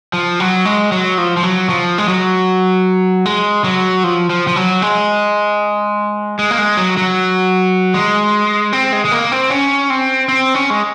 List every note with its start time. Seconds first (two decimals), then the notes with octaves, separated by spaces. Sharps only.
0.13 F3
0.40 F#3
0.65 G#3
0.92 F#3
1.18 F3
1.37 F3
1.43 F#3
1.69 F3
1.98 G#3
2.08 F#3
3.25 G#3
3.64 F#3
4.04 F3
4.30 F3
4.48 F3
4.56 F#3
4.82 G#3
6.39 G#3
6.51 A#3
6.58 G#3
6.77 F#3
6.97 F#3
7.94 G#3
8.73 C4
8.93 G#3
9.05 G#3
9.12 A#3
9.32 C4
9.50 C#4
9.90 C4
10.29 C4
10.55 C#4
10.70 G#3